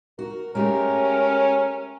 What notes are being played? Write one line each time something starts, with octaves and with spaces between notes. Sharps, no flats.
F#4 A#4
G#3 A3 C#4 G4 A#4